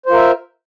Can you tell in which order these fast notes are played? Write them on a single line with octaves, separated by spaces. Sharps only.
C5 F4 A#4 E5